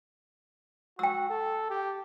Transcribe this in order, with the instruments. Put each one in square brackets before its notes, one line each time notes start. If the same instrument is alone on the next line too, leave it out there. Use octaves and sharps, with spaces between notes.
[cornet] F#4 [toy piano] G5 E6
[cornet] A4
G4